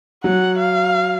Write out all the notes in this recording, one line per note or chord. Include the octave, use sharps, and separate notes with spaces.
F#3 F#5
F5